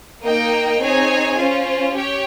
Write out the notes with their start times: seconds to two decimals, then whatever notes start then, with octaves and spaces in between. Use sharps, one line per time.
0.23 A#3 D#4 A#4 D#5 G5
0.80 C4 D#4 G#4 C#5 G#5
1.37 C#4 F4 C5
1.94 G4 C#5 G5